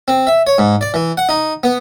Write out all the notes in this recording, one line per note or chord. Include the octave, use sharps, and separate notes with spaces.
C4
E5
C#5
G#2
D5
E3
F#5
D#4
B3